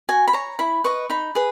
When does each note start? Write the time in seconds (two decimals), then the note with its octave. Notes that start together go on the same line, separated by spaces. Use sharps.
0.09 F#4 G#5
0.28 B5
0.33 C#5 A#5
0.59 E4 B5
0.84 B4 D#5 C#6
1.10 D#4 B5
1.35 G#4 B4